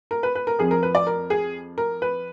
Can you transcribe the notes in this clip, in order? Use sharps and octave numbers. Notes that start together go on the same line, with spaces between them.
A#4
B4
B4
A#4
F2 F3 G#4
A#4
B4
D5
A#4
G#4
A#4
B4